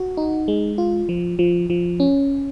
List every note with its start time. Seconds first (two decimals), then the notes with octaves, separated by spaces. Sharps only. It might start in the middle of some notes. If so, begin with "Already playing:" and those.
Already playing: F#4
0.17 D#4
0.48 G#3
0.78 F4
1.09 F3
1.39 F3
1.70 F3
2.00 C#4